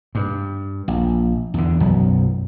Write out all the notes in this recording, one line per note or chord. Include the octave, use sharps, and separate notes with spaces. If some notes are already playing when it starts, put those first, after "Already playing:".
G2
A#1
E2 D3
B1 F#2 F#3 B3